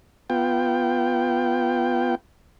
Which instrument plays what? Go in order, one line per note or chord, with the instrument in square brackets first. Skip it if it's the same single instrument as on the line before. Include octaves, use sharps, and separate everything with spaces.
[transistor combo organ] B3 F4 G5